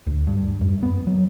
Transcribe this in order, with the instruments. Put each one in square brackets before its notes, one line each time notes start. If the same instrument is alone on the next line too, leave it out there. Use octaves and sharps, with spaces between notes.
[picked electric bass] D2
G2
F#2
B3
F#3